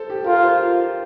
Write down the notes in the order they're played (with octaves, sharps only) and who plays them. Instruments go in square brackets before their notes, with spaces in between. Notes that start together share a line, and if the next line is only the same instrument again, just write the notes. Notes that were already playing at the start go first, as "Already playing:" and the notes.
Already playing: [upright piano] A4 C5
G4
[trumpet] F4 [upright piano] A#4
[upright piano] C5